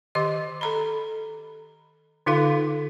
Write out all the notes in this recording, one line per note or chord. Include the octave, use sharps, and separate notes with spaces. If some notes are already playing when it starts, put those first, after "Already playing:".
D#3 G4 D#5 D6
A4 A#5 B5
D3 D#4 F4 A4 F5